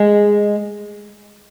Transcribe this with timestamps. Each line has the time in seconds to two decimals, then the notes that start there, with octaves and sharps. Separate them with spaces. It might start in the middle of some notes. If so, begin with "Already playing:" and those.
Already playing: G#3